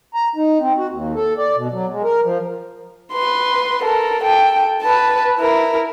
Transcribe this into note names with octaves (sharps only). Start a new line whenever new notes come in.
A#5
D#4
C4
F#4
D#2
A4
D5
B2
F#3
G#3
A#4
F3
B4 C6
A4 A#4
A4 G5
B4 A5
E4 A#4